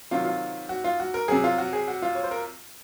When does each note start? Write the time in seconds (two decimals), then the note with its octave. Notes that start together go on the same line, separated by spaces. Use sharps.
0.11 C3 D#3 F#3 F4
0.25 F4
0.69 F#4
0.84 F4
1.00 F#4
1.14 A#4
1.28 C3 F#3 G#4
1.44 F4
1.58 F#4
1.73 G#4
1.88 F#4
2.02 F4
2.15 C#5
2.23 C5
2.31 A#4